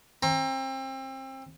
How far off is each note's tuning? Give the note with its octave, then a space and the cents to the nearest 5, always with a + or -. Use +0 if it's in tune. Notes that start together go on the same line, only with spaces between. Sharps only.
C4 +30 A#5 +0